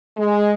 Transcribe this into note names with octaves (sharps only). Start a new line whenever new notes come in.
G#3